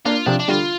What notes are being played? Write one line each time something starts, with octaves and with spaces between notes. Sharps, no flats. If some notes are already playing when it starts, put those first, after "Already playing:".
A#3 D4 F4
C3 F3 D4
D4
D3 G3 F4